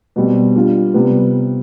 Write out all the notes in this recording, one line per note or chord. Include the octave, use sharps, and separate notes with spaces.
B2 G3 C4
G3 D4 F4
C3 G3 B3